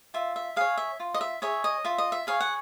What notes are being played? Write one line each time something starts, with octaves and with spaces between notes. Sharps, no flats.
F4 E5
E5
G#4 C#5 F5
E5
F4
D#5
E5
G#4 C#5 E5
D#5
F4 E5
D#5
E5
G#4 C#5 F5
F#5